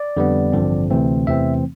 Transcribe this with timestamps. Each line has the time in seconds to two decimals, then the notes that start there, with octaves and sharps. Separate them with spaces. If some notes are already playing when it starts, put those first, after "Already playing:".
Already playing: D5
0.17 F2 D3 G3 B3
0.52 A1 G2 D3 F3 C4
0.90 D2 C3 E3 A3 C4
1.26 E2 C3 E3 A3 C4 E5